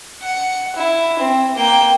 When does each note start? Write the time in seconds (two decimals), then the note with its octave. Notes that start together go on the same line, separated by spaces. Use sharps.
0.22 F#5
0.76 E4
1.19 C4
1.56 A#3 G5